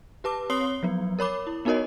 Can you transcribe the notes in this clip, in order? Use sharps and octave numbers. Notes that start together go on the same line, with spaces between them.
G4 B4 A5 D6
C4 C#5 C6 D#6 C7 G7
F3 F#3 B3
A#4 C#5 B5 D6
E4
B3 D#4 F#4 A#4 C#5 D#5